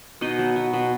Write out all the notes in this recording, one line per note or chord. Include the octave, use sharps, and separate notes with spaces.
B2 D#4 D#5
F#3
B3
B2